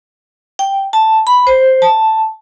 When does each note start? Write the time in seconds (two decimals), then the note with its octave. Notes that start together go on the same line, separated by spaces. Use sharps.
0.59 G5
0.93 A5
1.27 B5
1.47 C5
1.82 A5